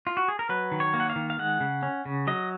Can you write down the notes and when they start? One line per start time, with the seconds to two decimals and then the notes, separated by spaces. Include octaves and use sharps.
0.07 F4
0.17 F#4
0.28 G#4
0.39 A#4
0.49 F#3 B4
0.72 D#3
0.80 C#5
0.94 A#3
1.00 F#5
1.10 F5
1.16 D#3
1.30 F5
1.39 G#3 F#5
1.61 C#3
1.83 C#4
2.05 C#3
2.27 F#3 D#5